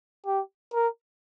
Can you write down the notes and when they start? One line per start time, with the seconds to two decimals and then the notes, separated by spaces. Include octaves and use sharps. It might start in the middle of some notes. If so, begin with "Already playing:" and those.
0.26 G4
0.73 A#4